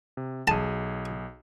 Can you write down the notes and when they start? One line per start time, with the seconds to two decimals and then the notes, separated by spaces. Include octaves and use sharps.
0.17 C3
0.48 B1 G#4 A5 D#7